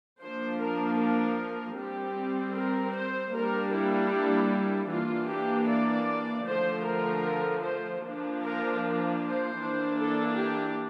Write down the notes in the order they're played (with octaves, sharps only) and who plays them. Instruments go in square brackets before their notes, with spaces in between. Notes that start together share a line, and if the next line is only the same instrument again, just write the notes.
[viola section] F3 A#3 D4 C5
A#4
A#4
G3 C4 G4
A#4
C5
G3 A#3 D4 A#4
E4
E3 A#3 D4 F4
G4
D5
D3 F3 A3 C5
A#4
C5
F3 A#3 D4
A#4
C5
E3 A#3 D4
A4
G4